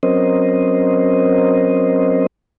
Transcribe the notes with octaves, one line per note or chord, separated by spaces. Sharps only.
F#3 C4 C#4 A#4 C5 D#5